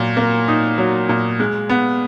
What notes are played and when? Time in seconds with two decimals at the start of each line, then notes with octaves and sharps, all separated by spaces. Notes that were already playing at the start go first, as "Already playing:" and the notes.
Already playing: A#2 F#3
0.17 A#3
0.48 D#4
0.78 F#3
1.09 A#2
1.40 G#3
1.69 B3